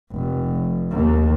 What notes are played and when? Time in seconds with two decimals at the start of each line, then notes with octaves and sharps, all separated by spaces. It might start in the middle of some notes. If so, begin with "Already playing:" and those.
0.12 F1
0.91 D#2